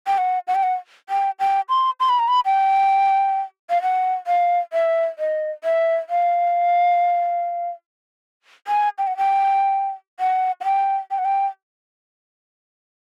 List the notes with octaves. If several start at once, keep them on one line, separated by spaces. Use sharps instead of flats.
G5
F#5
F#5
G5
F#5
G5
G5
C6
C6
B5
A#5
B5
G5
F5
F#5
F5
E5
D#5
E5
F5
G#5
G5
F#5
G5
F#5
F#5
G5
G5
F#5
G5